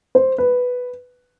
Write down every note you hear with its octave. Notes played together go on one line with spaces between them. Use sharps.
C5
B4